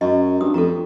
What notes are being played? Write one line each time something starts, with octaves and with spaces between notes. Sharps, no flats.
F#2 D#5
G2 D#6
F2 A4 A#5